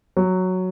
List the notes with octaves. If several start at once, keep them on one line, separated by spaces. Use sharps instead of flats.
F#3